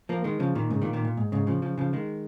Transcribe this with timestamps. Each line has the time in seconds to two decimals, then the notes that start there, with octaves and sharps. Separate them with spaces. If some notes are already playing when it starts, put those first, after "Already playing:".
0.09 F3 A#3
0.24 D#3 G#3
0.40 C#3 F3
0.55 A#2 D#3
0.71 G#2 C#3
0.82 A#2 D#3
0.93 A#2 D#3
1.05 A#2
1.17 G#2
1.32 G#2 C#3
1.47 C#3 F3
1.62 C#3 F3
1.78 C#3 F3
1.93 D#3 G#3